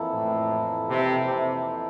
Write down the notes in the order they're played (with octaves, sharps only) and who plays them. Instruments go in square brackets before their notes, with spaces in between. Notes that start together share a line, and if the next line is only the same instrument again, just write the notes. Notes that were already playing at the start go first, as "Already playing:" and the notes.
Already playing: [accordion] F2 E3 A#3 E4 A4
[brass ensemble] A2
C3
C3